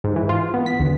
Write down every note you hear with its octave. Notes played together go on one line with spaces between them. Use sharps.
G#2
E3
F4
B3
B6
D2